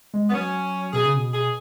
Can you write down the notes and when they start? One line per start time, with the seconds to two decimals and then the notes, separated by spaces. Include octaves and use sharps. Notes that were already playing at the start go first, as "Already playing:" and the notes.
0.14 G#3
0.29 B3
0.33 F#3 C#4
0.93 B2 G#4
1.05 C#3
1.16 B2
1.33 G#4